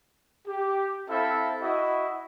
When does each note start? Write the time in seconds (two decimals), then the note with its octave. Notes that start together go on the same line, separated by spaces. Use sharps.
0.48 G4
1.10 C4 E4 A4 E5 F5
1.61 E4 F#4 D#5